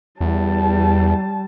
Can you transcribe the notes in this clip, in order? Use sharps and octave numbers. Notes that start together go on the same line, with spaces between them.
E2 G3 A5